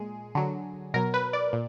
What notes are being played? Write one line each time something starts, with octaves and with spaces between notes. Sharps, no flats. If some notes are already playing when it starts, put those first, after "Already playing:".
Already playing: A#2 G#3 G#4
D3 F#3
B2 F#3 A#4
B4
D5
A#2